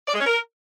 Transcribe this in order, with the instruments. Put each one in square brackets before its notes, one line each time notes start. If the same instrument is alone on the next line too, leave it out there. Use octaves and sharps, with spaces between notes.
[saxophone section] D5
G#3
C#4
A#4